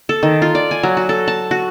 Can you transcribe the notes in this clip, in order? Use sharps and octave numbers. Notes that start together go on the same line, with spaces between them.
A4
D#3
F4
D5
G#5
F#3
F#4
A4
A5
F#4